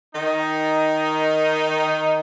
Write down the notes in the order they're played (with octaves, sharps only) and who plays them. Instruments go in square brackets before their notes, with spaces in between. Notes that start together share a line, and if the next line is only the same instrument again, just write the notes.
[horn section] D#3 D#4